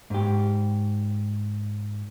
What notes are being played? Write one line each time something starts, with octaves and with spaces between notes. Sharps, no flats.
G#2 G4